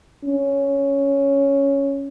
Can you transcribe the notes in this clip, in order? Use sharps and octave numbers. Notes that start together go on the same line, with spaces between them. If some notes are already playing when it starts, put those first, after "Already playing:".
C#4